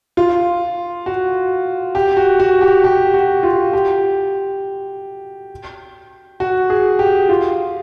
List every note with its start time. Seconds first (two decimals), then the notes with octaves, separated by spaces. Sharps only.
0.17 F4
1.06 F#4
1.95 G4
2.17 F#4
2.40 F#4
2.61 G4
2.84 G4
3.14 F#4
3.43 F4
3.73 G4
6.40 F#4
6.70 G#4
6.99 G4
7.29 F4